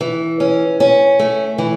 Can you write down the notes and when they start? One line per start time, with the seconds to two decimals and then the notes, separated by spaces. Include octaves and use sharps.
0.01 E3
0.40 C#4
0.80 C#4
1.19 A3
1.58 E3